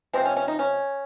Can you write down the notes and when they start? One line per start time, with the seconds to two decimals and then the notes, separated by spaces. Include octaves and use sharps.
0.13 C3 F3 G#3 C4
0.25 C#4
0.37 C#4
0.48 D#4
0.59 C#4